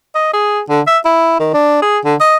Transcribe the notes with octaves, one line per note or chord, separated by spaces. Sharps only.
D#5
G#4
D3
E5
E4
D#3
D4
G#4
D3
D#5